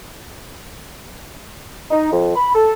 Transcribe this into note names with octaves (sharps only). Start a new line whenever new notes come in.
D#4
F2
B5
A4